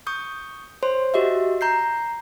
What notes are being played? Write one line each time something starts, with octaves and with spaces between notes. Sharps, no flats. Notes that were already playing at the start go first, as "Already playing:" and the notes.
C#6 D#6 G6
C5 C#5 C6
F#4 G4 D#5 E5
A#5 G6 C7